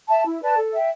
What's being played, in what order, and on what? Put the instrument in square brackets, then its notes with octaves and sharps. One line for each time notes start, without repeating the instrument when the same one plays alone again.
[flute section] E5 A5
E4
B4 D5 A5
A4
E5 G5